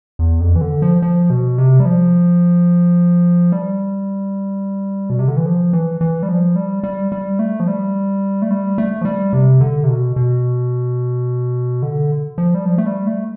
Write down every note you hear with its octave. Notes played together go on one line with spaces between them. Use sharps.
E2
F2
E3
D3
F3
F3
B2
C3
G3
F3
G3
B2
C3
D3
E3
F3
E3
E3
G3
F3
G3
G3
G3
A3
F3
G3
A3
G3
A3
F3
G3
C3
D3
C3
B2
B2
D3
F3
G3
F3
A3
G3
A3